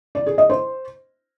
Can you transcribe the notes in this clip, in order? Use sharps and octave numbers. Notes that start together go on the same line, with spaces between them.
D5
G#4
D#5
C5